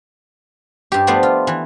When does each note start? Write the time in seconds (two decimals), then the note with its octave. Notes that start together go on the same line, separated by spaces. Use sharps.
0.92 G2 G4
1.07 F3 A3 B3 C5 D5
1.23 F4
1.47 E3